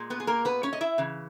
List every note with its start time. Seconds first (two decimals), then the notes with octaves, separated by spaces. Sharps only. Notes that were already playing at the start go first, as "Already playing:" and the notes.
Already playing: A#2 G#3
0.10 B3 B4
0.20 G#4
0.27 A#3 A#4
0.45 B3 B4
0.63 C#4 C#5
0.73 D#5
0.81 E4 E5
0.98 C#3 E3